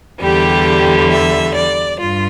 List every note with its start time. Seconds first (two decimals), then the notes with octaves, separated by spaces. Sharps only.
0.20 E2 D3 G3 G4
1.09 E5
1.54 D5
1.99 G2 F4